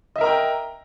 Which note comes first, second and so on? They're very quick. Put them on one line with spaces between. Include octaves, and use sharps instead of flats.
D#5 E5 A#4 A#5 G5